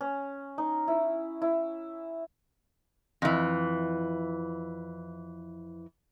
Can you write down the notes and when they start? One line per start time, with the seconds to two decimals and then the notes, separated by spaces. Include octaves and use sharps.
0.01 C#4
0.58 D#4
0.88 E4
1.42 E4
3.22 F2 E3